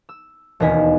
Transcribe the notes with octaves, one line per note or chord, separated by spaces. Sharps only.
E6
E1 D#2 A#4 D#5 G#5 B6